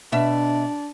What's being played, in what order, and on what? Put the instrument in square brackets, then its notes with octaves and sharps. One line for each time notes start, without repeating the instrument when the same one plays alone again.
[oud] B2 E5 [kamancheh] D4